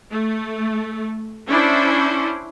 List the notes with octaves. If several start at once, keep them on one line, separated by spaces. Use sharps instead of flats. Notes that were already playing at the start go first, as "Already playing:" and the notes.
A3
C#4 D4 E4 C5